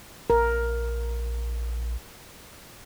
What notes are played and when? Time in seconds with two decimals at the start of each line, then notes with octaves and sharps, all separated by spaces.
0.30 A#1 A#4